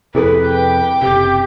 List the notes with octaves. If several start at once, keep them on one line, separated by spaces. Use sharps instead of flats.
F2 C3 E4 G#4 A4 B4
G5 D6
F#1 C3 G4